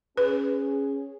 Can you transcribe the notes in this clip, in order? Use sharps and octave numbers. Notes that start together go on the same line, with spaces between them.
C#4 G#4 B4